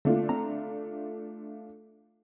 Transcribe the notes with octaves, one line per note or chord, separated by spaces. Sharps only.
D3 A3 A#3 D4 F4
C4 A#5